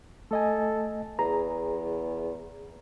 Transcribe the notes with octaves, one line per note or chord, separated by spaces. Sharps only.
A3 A4 D#5 G#5
E2 G#4 A#5